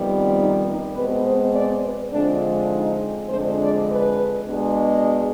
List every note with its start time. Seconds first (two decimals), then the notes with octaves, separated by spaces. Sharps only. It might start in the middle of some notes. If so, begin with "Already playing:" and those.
Already playing: F2 C3 D#3 G3 B3
0.37 D#4
0.66 D#4
0.95 B2 G#3 C4 B4
1.25 C5
1.53 D5
1.83 B4
2.13 D3 F3 G#3 C4 D4
2.70 D#4
3.29 F2 D3 G#3 D4 C5
3.59 D5
3.89 B4
4.47 B2 G#3 D4